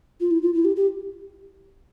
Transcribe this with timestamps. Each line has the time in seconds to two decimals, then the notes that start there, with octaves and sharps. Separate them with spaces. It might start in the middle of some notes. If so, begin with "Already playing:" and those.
0.20 F4
0.31 E4
0.43 F4
0.54 E4
0.65 G4
0.76 G4